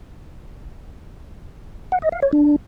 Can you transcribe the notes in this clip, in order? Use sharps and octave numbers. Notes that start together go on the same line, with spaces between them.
F#5
D#5
F5
C#5
D4